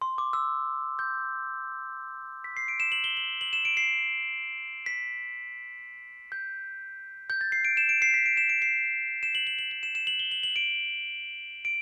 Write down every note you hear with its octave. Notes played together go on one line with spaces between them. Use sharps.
C6
D6
E6
G6
B6
C7
D7
E7
F#7
G7
F#7
F#7
E7
D7
C7
B6
G6
G6
A6
C7
D7
E7
D7
C7
B6
D7
E7
D7
C7
E7
F#7
F#7
F#7
F#7
E7
E7
F#7
G7
F#7
F#7
D7
D7